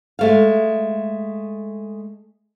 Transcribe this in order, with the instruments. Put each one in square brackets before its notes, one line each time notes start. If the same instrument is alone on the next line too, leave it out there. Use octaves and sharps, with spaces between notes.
[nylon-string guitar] G#3 A3 F5